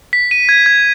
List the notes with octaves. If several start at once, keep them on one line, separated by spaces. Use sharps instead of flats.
B6
D#7
G#6
G#6